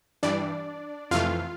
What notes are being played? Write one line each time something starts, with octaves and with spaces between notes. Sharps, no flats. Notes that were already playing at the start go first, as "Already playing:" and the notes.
G2 E3 G3 D4 D5
F2 C3 E3 A3 F4 F5